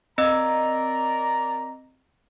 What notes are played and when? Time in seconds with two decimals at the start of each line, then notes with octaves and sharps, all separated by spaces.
0.18 C4 A#4 D5 D#5 A#5 E6